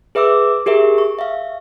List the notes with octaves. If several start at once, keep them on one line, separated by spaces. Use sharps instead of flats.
G#4 B4 E5 D6 E6
G4 G#4 A#4 E5
C#6
E5 F5